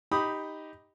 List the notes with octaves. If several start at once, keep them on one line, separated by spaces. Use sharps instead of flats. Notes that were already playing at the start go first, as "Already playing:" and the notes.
D#4 G4 B5 D#6